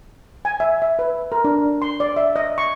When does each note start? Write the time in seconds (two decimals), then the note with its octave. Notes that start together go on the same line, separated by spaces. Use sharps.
0.45 G#5
0.60 E5
0.82 E5
0.99 B4
1.32 A#4
1.45 D4
1.82 C6
2.00 D5
2.16 E5
2.36 D#5
2.58 C#6